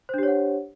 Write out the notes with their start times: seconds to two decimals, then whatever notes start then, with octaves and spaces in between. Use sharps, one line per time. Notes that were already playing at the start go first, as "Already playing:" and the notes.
0.09 C5
0.14 D4
0.18 G4
0.23 C#5
0.28 F#5